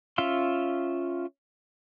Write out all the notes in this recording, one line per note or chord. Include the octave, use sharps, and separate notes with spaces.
C#4 F4 E5 F5 C6